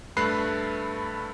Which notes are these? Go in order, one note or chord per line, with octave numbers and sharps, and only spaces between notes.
G2 A3 B4 B5 F#6 C7